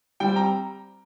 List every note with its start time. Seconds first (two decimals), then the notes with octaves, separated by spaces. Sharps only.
0.20 G3 C4 G5
0.36 A#5